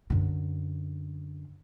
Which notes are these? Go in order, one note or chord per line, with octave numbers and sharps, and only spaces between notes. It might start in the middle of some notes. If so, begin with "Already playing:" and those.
F#2 D3